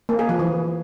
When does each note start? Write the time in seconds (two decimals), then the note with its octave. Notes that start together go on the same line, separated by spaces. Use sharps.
0.09 A#3
0.19 G#4
0.29 F3
0.39 E3